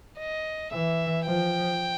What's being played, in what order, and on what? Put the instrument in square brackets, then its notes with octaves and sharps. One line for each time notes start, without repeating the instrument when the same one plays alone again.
[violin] D#5
[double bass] E3 [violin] E5
[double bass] F3 [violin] G5